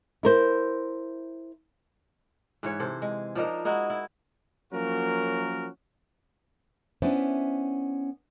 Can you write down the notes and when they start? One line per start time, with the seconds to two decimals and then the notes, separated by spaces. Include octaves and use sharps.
0.23 E4 A#4 C5
2.63 G#2 E3 C#5
2.79 C3 A4 C5
3.02 G#3
3.35 F3 D4 D#4 A#4
3.65 G#3 D#4 E4 F#4
3.90 E4
4.72 F3 F#3 A#3 C#4 F#4 A#4
7.02 B3 C#4 D4 E4 B4 C5